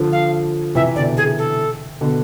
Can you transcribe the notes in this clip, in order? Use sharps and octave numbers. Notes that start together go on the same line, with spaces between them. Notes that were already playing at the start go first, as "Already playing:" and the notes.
Already playing: D3 F3
F5
C3 E3 E5
B2 D3 D5
G#4
A4
B2 D3